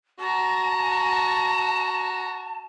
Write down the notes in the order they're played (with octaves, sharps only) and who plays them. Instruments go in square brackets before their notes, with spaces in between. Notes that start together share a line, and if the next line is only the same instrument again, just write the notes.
[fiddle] F#4 A#5 [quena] A5